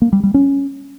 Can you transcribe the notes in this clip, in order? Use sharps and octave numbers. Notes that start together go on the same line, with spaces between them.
A#3
G3
G3
C#4